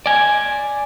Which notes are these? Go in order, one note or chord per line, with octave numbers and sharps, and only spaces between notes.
D5 G#5